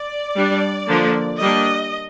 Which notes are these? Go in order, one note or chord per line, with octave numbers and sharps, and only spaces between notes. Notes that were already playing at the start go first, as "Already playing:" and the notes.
Already playing: D5
G3 D4
D3 F3 A#3 D4
G3 A#3 D4 D#5